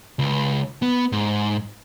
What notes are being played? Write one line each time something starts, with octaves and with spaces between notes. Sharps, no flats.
C#2
B3
G#2